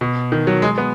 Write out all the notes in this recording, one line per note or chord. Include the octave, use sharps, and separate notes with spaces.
B2
D#3
F#3
G#3
B3